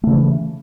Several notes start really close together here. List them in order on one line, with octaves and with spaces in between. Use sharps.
A3 C#3 E3